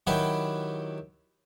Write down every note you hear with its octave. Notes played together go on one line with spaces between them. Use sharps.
D#3 F#3 E4 G4 B4